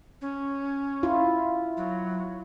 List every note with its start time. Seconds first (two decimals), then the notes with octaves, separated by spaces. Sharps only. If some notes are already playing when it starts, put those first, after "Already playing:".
0.21 C#4
1.03 E4 F4
1.77 F#3